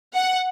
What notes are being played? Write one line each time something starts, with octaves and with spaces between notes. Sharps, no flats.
F#5